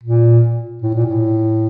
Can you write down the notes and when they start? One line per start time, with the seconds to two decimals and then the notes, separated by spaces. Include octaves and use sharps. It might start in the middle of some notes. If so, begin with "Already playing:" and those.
0.03 A#2
0.82 A2
0.94 A#2
1.06 A2